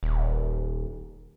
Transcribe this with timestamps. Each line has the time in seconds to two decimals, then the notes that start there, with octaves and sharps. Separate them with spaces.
0.03 D#1